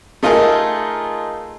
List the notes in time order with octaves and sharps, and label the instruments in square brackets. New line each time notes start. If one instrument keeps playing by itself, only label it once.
[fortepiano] A3 D#4 F4 G#4 A#4